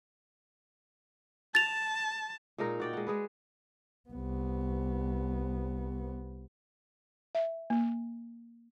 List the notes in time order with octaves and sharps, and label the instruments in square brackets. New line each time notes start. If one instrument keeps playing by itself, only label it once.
[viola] A5 [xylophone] A6 F7
[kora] A#2 G#3 D#4 A#4
F#4 D5 G5
G#3 F#5
G#3 G#4 B4
[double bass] C2 B3
[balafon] E5
A#3